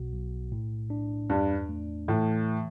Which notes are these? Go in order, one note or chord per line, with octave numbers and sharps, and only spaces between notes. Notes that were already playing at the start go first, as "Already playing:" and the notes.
Already playing: B1 B2 F#4
B1
A2
D4
E2 G2
A3
A2 E3